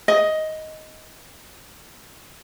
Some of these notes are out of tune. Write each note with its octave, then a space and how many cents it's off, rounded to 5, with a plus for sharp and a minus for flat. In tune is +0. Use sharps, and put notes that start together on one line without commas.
D#5 +10